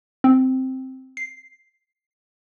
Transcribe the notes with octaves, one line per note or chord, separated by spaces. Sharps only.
C4
C7